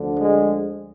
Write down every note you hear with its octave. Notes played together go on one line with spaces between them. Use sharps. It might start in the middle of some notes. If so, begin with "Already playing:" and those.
Already playing: D2 D3 F3
G#3